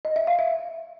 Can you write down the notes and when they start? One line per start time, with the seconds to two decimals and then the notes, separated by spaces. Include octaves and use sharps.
0.05 D#5
0.16 E5
0.27 F5
0.39 E5